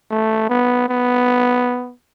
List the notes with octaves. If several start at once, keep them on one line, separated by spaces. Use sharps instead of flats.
A3
B3
B3